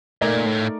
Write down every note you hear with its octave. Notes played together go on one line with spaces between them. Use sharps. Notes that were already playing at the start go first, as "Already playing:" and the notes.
A#2 A3 D#4 A#4 D5
A2